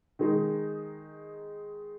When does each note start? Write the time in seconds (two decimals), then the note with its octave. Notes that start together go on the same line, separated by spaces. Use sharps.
0.19 D#3 G#3 D#4